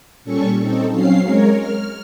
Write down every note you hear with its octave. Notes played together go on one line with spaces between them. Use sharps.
A#2 G3 C#4 A4 C#6
C4 D#4 A4
F#3 C4 C#4 F5 C7
G#3 A#4 C#5
F6